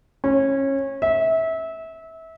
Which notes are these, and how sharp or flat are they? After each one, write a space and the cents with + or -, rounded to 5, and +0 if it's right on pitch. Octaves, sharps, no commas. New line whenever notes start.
C#4 -25
E5 -25